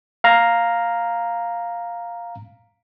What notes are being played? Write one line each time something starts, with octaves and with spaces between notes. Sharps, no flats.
F5 A#5